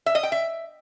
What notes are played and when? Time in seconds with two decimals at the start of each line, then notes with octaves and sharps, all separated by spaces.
0.06 E5
0.15 D#5
0.23 G5
0.32 E5